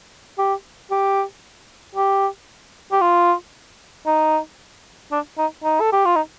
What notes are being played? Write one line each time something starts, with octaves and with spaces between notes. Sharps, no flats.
G4
G4
G4
G4
F4
D#4
D4
D#4
D#4
A4
G4
F4
D#4